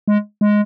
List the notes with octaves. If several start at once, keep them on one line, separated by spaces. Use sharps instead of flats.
G#3
G#3